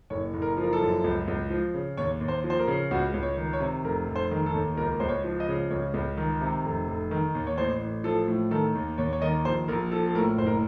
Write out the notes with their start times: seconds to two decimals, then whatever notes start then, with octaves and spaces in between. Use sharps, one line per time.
0.10 F#1 C#5
0.34 F#1
0.42 A#4
0.57 F3
0.64 A#4
0.73 A4
0.80 F#2
1.04 C#2
1.28 C#2
1.50 F3
1.74 C#3
1.97 D#2 C#5
2.20 D#2
2.28 C5
2.44 F3
2.50 C5
2.59 A#4
2.67 C#3
2.91 C#2 F#4
3.14 C#2
3.23 C#5
3.37 D#3
3.53 C#5
3.60 C3
3.84 F1 A#4
4.08 F1
4.16 C5
4.32 D#3
4.46 A4
4.54 D#2
4.77 C#2 A#4
4.91 A#4
5.00 C#2 C5
5.09 C#5
5.24 F3
5.40 D#5
5.48 C#3
5.71 C#2 C#5
5.94 C#2
6.18 D#3
6.41 C3
6.65 F1
6.88 F1
7.11 D#3
7.35 D#2
7.47 C#5
7.58 A1 C5
7.81 A1
8.04 F3 A4
8.28 A2
8.51 D#3 A4
8.75 D#2
8.98 D#2 C#5
9.13 C#5
9.22 D#3 D#5
9.45 A#1 C5
9.68 A#1 A#4
9.91 F3 A4
10.06 A4
10.15 A2 A#4
10.38 F#1 C5
10.47 A#4